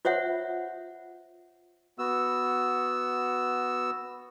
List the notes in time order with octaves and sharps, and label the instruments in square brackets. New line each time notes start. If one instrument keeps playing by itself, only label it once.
[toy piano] F4 C5 C#5 E5 F#5
[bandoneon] B3 F#4 E6